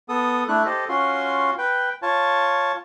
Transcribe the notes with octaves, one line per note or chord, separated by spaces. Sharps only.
B3 A4 D#6
A3 D4 E4 F#6
G4 A4 C5 D#5
C#4 F4 F#4 C6
B4 G5
F4 C#5 A5